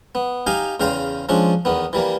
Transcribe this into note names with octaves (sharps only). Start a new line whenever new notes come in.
B3
D#4 G4 F5 G#5 A#5
E2 C#3 F5 G5 A#5 C6
F3 G#3 C#4 D4
E2 D#3 B3
E3 G3 A#3